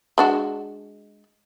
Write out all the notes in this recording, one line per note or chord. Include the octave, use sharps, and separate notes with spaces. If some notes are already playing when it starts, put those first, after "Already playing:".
G#3 D4 F#4